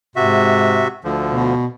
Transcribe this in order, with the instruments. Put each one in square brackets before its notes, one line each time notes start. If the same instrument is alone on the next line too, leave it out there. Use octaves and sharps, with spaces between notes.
[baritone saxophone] G#2 [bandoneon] C3 F#4 E5
[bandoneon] D2 D3 F3
[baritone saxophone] B2